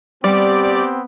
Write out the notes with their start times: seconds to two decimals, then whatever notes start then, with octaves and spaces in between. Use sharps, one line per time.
0.24 G3 B3 C4 G4 D5